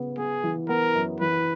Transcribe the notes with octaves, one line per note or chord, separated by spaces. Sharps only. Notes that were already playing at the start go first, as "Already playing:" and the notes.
Already playing: C#3 B3
B3 G#4
E3
B3 A#4
F#2
E3 B4